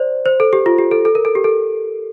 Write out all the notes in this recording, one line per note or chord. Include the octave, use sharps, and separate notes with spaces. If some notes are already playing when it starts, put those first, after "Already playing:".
Already playing: C5 D5
C5
A4
G4
F4
G4
A4
A4
A#4
A4
G4
A4